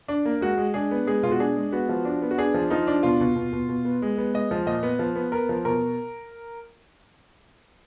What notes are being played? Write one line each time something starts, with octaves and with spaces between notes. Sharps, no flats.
D4
A#3
G#3 F#4
G#3
D4 G#4
B3
G#3 G#4
B2 F4
F#4
D4 G#4
G#3
B3 F#4
F3
D4
B3
F#4
D4 G#4
F3
F3 D#4
D4
B2 F4
B2
B2
B2
B2
B3
G#3
B3
G#3 D#5
F3
A#2 D#5
B3
F3
B3
B3 A#4
F3
B2 A#4